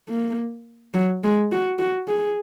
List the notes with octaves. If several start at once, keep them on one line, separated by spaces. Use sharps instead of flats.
A#3
F#3
G#3
F#4
F#4
G#4